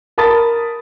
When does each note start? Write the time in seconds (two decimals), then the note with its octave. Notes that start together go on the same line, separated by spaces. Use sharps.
0.18 A#4 A5 B5 D#6 A6